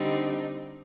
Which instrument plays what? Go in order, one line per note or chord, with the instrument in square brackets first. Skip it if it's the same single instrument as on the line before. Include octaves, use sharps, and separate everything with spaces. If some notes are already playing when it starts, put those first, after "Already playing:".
Already playing: [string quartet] D3 G3 C4 D#4